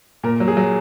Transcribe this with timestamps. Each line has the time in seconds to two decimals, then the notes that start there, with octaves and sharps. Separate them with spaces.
0.24 A#2 A#4
0.40 F#3
0.48 G#4
0.57 F#3